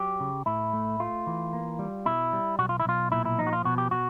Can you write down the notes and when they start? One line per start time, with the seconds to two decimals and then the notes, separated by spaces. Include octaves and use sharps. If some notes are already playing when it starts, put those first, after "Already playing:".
Already playing: F#3 G4
0.20 C#3
0.46 A2 E4
0.73 A3
1.00 A3 F4
1.27 E3
1.53 A#3
1.79 G3
2.05 B2 E4
2.33 G3
2.59 B1 F#4
2.69 F4
2.80 E4
2.85 B1 F4
3.12 A#2 E4
3.25 E4
3.39 F3 D#4
3.47 F#4
3.53 F4
3.65 B2 F#4
3.78 G4
3.91 B2 F#4